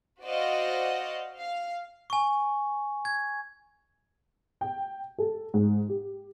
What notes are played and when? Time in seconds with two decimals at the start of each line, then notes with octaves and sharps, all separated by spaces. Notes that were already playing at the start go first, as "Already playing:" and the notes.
0.24 F#4 C5 D5 D#5 F5 F#5
1.40 F5
2.10 G#5 C#6
3.05 G#6
4.61 G5
5.18 A4
5.54 G#2
5.89 G4